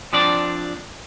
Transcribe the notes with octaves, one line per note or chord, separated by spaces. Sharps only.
F3 C4 D4 D5